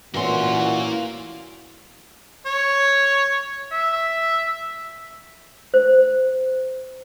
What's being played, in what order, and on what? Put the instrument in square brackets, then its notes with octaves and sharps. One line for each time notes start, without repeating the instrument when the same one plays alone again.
[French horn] A#2 [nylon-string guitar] E3 C#4 [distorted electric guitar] A#3 C6 [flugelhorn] F#4
[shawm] C#5
E5
[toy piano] C5